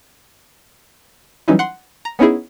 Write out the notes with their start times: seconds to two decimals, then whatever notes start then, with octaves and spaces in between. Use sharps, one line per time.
1.48 E3 F#3 G3 C#4 D#4 E4
1.59 F#5 C6
2.05 A#5
2.19 B3 C#4 D#4 E4 G#4